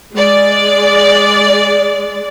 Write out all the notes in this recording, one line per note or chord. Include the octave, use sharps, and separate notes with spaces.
G#3 D5